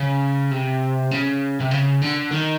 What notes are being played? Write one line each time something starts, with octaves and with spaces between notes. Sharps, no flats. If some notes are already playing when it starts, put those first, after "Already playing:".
Already playing: C#3
C3
C#3
C3
C#3
D3
D#3